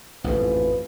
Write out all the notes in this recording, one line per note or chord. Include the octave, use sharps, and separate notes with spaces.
A1 F2 G#2 C4 F4 B4